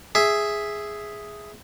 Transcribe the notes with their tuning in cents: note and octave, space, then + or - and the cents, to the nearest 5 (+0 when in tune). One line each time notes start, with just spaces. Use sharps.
G#4 +0 E5 +0